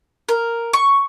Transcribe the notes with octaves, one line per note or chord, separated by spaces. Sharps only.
A#4
C#6